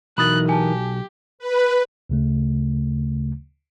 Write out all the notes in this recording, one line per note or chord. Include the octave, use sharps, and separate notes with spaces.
B1 E3 D#4 A#4 B5 D#6 F#6 A6
G4 G#5 A5
B4
D2 C#3 A3